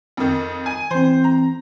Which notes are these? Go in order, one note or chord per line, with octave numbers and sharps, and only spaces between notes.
F2 D#3
G#5
E3 C4 C5
A#5